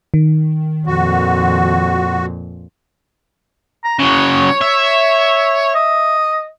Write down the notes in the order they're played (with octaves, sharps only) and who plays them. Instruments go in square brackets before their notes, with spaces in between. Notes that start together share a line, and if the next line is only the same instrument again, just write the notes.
[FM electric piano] D#3
[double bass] F2 A#2 [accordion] F#4
[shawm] A#5
[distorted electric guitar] C#3 F#3 [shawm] C#5
[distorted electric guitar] E5
[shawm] D#5